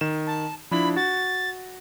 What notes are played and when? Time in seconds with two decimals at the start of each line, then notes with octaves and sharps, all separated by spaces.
0.01 D#3 E7
0.27 A5
0.71 F3 D4 E4 B5
0.96 F#4 A6